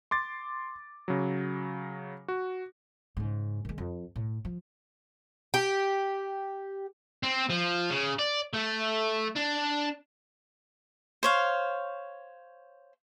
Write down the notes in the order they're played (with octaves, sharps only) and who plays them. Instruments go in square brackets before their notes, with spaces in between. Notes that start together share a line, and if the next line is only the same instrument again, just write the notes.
[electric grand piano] C6 D6 A6
C#3 F#3
F#4
[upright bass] G#2 C#3
D#3 G#3
F2
A2
F3
[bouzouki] G4
[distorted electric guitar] C4
F3
C#3
D5
A3
D4
[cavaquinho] C5 C#5 F5